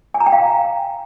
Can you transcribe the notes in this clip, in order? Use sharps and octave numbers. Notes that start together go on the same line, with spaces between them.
G#5
A#5
G5
F5